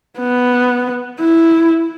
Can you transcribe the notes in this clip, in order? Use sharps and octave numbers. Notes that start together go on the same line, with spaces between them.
B3
E4